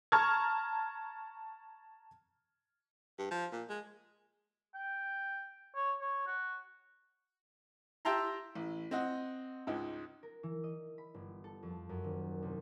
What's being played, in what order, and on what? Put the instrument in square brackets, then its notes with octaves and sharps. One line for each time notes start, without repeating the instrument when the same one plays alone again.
[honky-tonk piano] A5 A#5 C#6 F6 G#6
[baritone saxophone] G2
F3
A#2
G#3
[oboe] G5
C#5
C#5
F#4
[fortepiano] G4 E5 G5 A5 A#5 C6
A1
C4 D#5 F#5
C#2 G#2
[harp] A#4
E3
D#5
B5
G1
A4
F2
F#2
D#1
C2